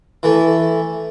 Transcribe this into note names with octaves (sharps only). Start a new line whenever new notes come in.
E3 A3